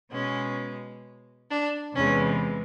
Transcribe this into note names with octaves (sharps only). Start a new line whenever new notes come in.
B2 G#3 C#4
D4
E2 C3 E3 G#3 C#4